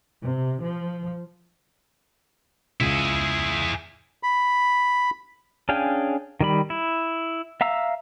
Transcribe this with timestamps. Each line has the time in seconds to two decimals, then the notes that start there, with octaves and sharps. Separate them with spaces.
0.23 C3
0.61 F3
2.80 C#2 E4 G#4
4.23 B5
5.69 C#4 D4 G#4 F5 G5
6.41 D#3 G3 B5
6.70 E4
7.61 E5 F5 A#5 E6